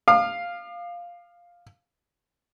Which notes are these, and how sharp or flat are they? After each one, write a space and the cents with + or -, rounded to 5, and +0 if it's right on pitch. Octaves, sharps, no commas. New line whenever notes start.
F5 +0 D6 +45